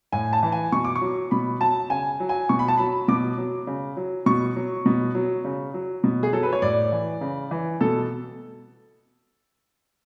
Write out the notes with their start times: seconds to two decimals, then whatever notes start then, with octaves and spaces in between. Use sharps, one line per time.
0.12 A2 G#5
0.33 A5
0.43 E3
0.52 G#5
0.72 B2 C#6
0.85 D6
0.96 C#6
1.01 F#3
1.31 B2 B5
1.60 F#3 A5
1.90 C#3 G#5
2.20 F#3
2.29 G#5
2.49 B2 C#6
2.59 B5
2.68 A5
2.78 F#3 B5
3.08 B2 D6
3.38 F#3
3.67 C#3
3.97 F#3
4.26 B2 C#6
4.56 F#3
4.86 B2
5.15 F#3
5.45 C#3
5.74 F#3
6.04 B2
6.23 G#4
6.33 F#3 A4
6.43 B4
6.53 C#5
6.62 A2 D5
6.92 E3
7.21 C#3
7.51 E3
7.81 B2 A4